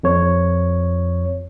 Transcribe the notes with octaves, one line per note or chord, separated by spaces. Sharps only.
F2 C#5